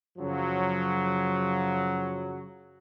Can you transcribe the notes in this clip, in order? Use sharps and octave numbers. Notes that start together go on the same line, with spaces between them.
F#2 C#3 F3 F#3